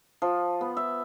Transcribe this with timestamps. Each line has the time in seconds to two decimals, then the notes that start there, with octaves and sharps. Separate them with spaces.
0.22 F3
0.61 B3
0.77 E5